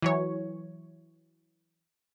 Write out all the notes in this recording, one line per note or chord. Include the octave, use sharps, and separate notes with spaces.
E3 F#3 C#5